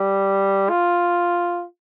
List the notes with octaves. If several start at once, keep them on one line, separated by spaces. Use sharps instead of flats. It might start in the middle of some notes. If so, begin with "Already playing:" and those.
Already playing: G3
F4